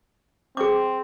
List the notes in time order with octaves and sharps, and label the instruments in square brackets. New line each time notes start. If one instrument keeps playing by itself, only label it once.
[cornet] C4 [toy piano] G#4 D6